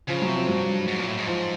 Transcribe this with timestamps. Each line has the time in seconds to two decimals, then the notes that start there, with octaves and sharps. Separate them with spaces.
0.08 C#3 F3
0.22 F#3
0.29 C3
0.35 F3
0.48 G2 F#3
0.88 G#2
0.98 A#2
1.07 A2
1.17 G#2
1.27 F3